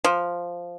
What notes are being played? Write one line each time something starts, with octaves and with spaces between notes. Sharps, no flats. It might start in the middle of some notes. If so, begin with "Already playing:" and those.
F3